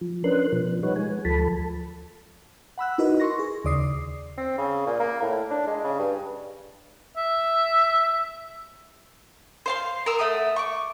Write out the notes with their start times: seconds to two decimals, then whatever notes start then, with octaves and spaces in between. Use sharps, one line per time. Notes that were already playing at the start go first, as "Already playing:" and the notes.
0.01 F3
0.24 C#4 D4 A#4 B4 C6 F#6
0.53 B2 F3
0.83 G3 D#4 B4 C#5 F#5
0.96 G#3 G#5
1.25 D2 F3 A4 A5 B5
2.78 F#5 B5 E6 F#6
2.98 D#4 E4 F#4 A#4 B4 D#5
3.20 C6 C#6 A#6
3.39 G#4
3.64 D#2 C#3 D5 D#6 C7
4.37 C4
4.58 C#3
4.86 A#2
5.00 A#3
5.22 A2
5.51 D4
5.67 G#3
5.84 C#3
5.99 G2
7.17 E5
9.66 C5 F5 C6
10.06 A#4 E6
10.19 A3 E5 F#5 D#6
10.56 C#6 D6